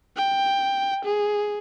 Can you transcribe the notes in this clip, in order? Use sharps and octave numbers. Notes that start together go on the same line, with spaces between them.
G5
G#4